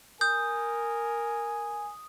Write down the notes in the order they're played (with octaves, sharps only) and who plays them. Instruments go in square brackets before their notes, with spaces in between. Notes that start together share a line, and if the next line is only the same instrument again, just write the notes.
[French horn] A#4 [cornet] G#5 [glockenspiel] D#6 [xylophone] G6